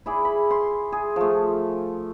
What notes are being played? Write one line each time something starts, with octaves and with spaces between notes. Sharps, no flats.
E4 G#4 D5
B5
C6
G#4
F3 A3